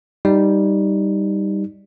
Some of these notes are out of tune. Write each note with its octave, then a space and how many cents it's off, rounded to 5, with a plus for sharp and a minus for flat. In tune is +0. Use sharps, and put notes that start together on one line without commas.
G3 +0 D#4 +0